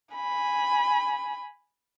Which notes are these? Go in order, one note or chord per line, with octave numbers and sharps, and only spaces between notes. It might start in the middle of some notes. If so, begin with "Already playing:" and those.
G#5 B5